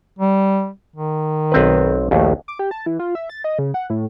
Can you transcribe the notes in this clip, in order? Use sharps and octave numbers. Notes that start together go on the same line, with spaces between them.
G3
D#3
B1 C4 B4
A#1 D#2 A3
D6
G4
A5
E3
F4
E5
A6
D#5
C#3
F#5
A2